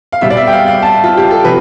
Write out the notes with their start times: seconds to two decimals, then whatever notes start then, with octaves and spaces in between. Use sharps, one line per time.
0.12 F5
0.21 B2 G3 E5
0.30 D5
0.37 E5
0.47 G5
0.52 F5
0.68 F5
0.82 A5
1.04 F4
1.17 G4
1.31 A4
1.44 C3 F3 B4